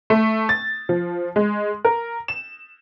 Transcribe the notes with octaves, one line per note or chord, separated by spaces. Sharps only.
A3
A6
F3
G#3
A#4
E7